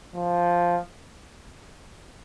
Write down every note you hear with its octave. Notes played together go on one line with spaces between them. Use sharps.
F3